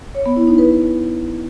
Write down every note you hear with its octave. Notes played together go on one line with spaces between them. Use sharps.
C#5
B3
E4
D#4
B4